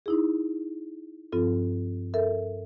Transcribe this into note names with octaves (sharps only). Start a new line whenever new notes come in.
D#4 E4 G#4
G2 F3 C4 F4 A4
A4 A#4 E5